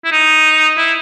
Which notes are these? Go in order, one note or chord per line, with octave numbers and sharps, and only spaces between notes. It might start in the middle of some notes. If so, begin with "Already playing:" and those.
E4
D#4
E4